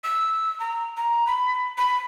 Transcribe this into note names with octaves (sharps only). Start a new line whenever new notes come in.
E6
A#5
A#5
B5
B5